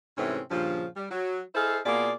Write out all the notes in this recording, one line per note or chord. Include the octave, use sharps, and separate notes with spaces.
G#2 C3 E3 A3 C4 C#4
G2 A#2 C#3 F3
G3
F#3
E4 G#4 A4 C5 D#5 F5
B2 A#3 F4 G#4 D5